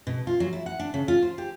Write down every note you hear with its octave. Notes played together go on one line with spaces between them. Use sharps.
B2
F4
F#3
E4
F#5
D4
C#3
F4
C5
G4